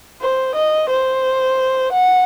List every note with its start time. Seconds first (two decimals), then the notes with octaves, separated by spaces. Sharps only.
0.21 C5
0.56 D#5
0.90 C5
1.93 F#5